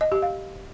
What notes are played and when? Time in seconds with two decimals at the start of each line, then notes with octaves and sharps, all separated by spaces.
0.01 D#5
0.12 G4
0.22 F5